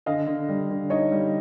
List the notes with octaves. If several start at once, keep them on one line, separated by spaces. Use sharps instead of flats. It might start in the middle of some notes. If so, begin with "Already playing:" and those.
D3 D#5 F5
D3
G3
D3
D#4 C#5 D#5
G3